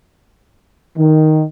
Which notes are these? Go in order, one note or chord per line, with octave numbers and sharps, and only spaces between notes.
D#3